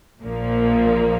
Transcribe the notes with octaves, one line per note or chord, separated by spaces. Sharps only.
A#1 A#2 F3 A#3